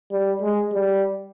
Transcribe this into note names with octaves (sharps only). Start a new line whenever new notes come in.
G3
G#3
G3